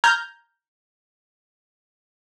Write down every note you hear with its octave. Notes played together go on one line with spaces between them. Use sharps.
A#5 F6 G6 G#6